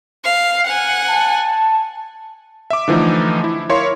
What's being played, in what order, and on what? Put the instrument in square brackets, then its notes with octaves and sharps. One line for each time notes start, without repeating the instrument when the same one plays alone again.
[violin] F5
F#5 G#5
[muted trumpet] A5
[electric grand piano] E5 D6
D3 E3 F3 A3 D#4
E4
E4 A#4 C#5 F5 C6 C#6